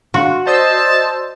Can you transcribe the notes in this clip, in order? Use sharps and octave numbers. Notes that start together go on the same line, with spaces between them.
D4 F#4 F5 C6
C5 D5 D#5 A5 D#6 E6